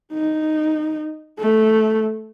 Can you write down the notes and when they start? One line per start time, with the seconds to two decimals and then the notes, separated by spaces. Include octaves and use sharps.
0.13 D#4
1.40 A3